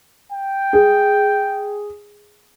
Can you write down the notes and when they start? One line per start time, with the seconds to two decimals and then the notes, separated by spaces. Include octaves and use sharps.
0.32 G5
0.73 G#4